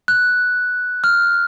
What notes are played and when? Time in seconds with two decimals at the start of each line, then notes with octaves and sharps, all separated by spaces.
0.08 F#6
1.04 F6